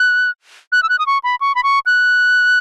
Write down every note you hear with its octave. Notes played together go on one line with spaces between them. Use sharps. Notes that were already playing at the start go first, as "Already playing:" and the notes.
Already playing: F#6
F#6
E6
F#6
D#6
C#6
B5
C#6
B5
C#6
F#6